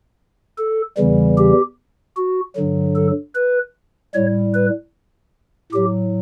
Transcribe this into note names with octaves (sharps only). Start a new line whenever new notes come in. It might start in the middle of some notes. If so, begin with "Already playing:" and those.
A4
E2 C#3 E3 G3
G4
F#4
G2 D3 F#3
A4
B4
A2 G3 C#5
B4
A2 F#3 G4